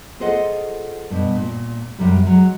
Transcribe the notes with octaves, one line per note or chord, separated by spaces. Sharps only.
F4 G#4 A4 C5 D#5 F#5
G2 B2
A#2
F#2 C3 F#3 G3
F#3 G#3